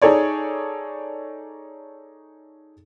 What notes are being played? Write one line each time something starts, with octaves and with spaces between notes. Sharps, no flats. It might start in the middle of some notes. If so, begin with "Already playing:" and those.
D#4 G#4 A4 C#5 D5